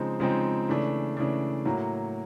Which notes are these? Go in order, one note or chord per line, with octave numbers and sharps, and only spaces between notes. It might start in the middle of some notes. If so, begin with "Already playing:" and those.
Already playing: C#3 F3 G#3 C4 D#4
C#3 F3 G#3 C4 D#4
C#3 E3 A3 D4
C#3 E3 A3 D4
A2 F#3 A#3